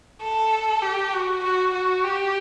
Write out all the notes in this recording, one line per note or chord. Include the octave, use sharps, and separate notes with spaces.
A4
G4
F#4
F#4
F#4
G4